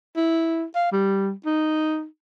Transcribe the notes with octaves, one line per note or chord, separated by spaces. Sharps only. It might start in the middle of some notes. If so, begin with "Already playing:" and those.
E4
F5
G3
D#4